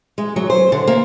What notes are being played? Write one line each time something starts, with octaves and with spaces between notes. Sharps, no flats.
G#3
F#3
C5
D3
A#3